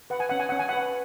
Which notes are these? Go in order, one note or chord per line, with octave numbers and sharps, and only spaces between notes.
B4 F#5
G#5
C#4 F#5
G#5
C#4 F#5
G#5
B4 F#5